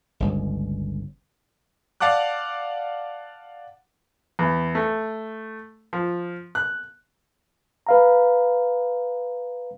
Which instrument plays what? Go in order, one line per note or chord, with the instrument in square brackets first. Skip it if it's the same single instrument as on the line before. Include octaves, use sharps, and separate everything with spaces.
[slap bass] G1 C#2
[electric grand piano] D5 F5 F#5 A5 D6 F#6
[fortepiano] E2
A3
F3
F#6
[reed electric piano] B4 F5 A#5